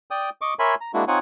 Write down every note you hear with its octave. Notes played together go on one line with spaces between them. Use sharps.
D5 G5 D#6
D#5 C#6 D6
A#4 C#5 E5 G#5 B5 C6
A#5
G#3 A#3 D4 E4 F#4
C4 D#4 F4 C#5 F#5 G#5